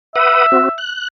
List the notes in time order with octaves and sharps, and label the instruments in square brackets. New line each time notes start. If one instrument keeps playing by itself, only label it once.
[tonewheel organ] B4 F#5 D#6 [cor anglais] E5
[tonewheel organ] C4 F#4
F#6